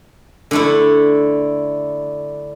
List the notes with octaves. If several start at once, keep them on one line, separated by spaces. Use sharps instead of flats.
D3 A3 E4